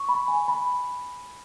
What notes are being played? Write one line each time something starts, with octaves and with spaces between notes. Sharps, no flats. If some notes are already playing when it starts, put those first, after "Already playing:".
Already playing: C#6
B5
G#5
B5